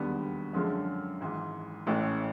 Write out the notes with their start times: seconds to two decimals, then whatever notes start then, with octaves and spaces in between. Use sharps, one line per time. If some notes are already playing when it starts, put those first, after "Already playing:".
Already playing: E1 D#2 D3 G3 B3
0.53 F#2 D3 F3 G#3 C#4
1.20 G#1 G#2 E3
1.87 A1 A2 E3 A3 C#4